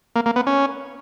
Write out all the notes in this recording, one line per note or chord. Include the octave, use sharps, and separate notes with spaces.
A#3
A#3
B3
C#4